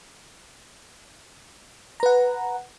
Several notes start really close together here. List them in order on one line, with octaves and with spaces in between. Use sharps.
A#5 B4 F#5